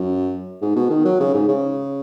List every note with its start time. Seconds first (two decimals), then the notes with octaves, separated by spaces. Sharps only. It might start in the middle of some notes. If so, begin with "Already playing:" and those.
Already playing: F#2
0.61 G#2
0.76 B2
0.90 D#3
1.05 F#3
1.20 C#3
1.34 G#2
1.48 C#3